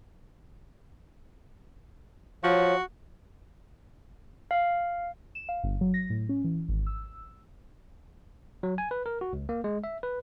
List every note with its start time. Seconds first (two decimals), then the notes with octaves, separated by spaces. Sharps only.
2.44 F3 F#4 C#5
4.51 F5
5.35 E7
5.49 F5
5.64 G1
5.81 F#3
5.94 A#6
6.10 A2
6.29 C#4
6.44 E3
6.69 G#1
6.87 E6
8.63 F#3
8.78 G#5
8.91 B4
9.06 A#4
9.21 F#4
9.33 C#2
9.49 A#3
9.64 G#3
9.84 E5
10.03 B4